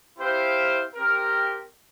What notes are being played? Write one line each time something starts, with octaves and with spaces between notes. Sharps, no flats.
C4 E4 G4 C5 F5
C4 G4 A#4